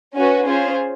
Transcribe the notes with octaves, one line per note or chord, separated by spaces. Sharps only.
C#4 F#4 B4
C#4 F4 G#4 C5